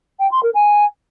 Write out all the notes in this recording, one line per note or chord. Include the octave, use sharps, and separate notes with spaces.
G5
C6
A#4
G#5